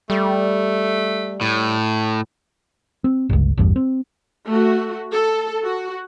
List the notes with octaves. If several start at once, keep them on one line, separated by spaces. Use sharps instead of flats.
G3 A3
A2
C4
G1 C#2
A1 E2 G2
C4
A3 F#4
A4
F#4